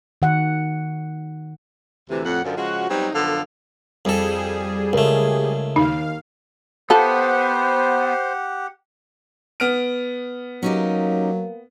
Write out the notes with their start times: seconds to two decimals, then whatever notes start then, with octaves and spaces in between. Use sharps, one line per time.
0.22 D#3 F#5
2.10 D2 C3 E3
2.25 F2 A2 F#5
2.45 F#2 D3 F3
2.57 C#3 F3 G#3 F#4
2.90 F#3 G3 B3 C4 D#4
3.14 F#2 D3 F3 B3 A4 F5
4.05 F2 G3 G#4 A4
4.93 C#2 A3 A#4
5.76 D#2 D#4 F5
6.90 B3 F4 G4 A4 C5 F#5
9.60 B3 F6 D7
10.63 F#3 A#3 C#4 D#4 G4